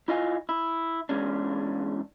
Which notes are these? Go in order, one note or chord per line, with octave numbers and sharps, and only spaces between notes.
E4 F4 D#5 F5 G#5
E4
E2 G#3 C#4 D4